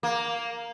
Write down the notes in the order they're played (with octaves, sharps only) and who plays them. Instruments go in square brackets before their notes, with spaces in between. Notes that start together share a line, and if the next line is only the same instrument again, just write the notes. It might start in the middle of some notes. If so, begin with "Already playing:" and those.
[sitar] A#3